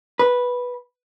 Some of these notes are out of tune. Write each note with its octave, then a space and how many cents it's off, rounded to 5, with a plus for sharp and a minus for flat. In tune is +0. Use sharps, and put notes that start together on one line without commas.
B4 -5